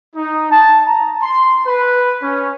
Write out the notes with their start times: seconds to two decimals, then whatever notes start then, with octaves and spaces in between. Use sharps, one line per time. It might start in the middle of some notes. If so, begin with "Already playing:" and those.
0.16 D#4
0.51 A5
0.87 A#5
1.22 C6
1.66 B4
2.23 C#4